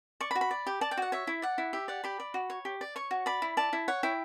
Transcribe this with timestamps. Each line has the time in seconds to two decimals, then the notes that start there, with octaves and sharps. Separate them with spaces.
0.20 D5 C#6
0.31 B5
0.35 F#4
0.41 B5
0.51 D5
0.67 G4
0.81 D5 A5
0.91 G5
0.97 F#4 F#5
1.12 C#5 E5
1.27 E4
1.42 D5 F#5
1.58 E4
1.73 G4 E5
1.88 D5 F#5
2.04 G4 B5
2.20 D5
2.34 F#4
2.50 C#5
2.65 G4
2.81 D5
2.96 C#5 C#6
3.11 F#4
3.26 D5 B5
3.42 E4
3.57 D5 A5
3.73 E4
3.88 C#5 F#5
4.03 E4 G5